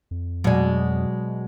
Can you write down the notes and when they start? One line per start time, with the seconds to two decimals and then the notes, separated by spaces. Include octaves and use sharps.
0.11 F2
0.44 B2 F#3 G#3 D5